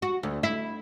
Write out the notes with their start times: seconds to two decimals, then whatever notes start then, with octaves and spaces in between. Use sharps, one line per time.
0.02 F#4
0.23 D2
0.43 E4